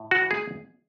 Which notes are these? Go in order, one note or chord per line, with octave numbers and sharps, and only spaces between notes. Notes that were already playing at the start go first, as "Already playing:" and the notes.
Already playing: A2
F#4
E3
G#4